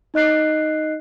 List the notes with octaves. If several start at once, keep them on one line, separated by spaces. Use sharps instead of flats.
D#4 D#5 F#6 C7